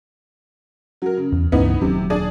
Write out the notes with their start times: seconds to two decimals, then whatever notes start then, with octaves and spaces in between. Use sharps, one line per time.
1.02 F#3 A#4
1.17 C#3
1.32 E2
1.52 C#2 G2 E3 A3 B3 D#4
1.81 D#1 C3 F#3
2.10 D4 G#4 D5